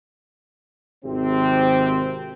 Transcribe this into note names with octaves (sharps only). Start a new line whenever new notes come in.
G#1 C3 C4